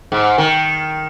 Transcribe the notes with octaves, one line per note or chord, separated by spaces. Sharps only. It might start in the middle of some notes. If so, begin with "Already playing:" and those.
G#2
D#3